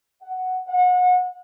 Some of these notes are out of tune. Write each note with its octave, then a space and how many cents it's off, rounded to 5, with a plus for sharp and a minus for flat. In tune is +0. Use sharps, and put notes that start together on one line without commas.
F#5 +5
F#5 -30